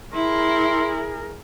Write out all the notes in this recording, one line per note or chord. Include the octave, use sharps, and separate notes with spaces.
E4 G#4 A#4 C6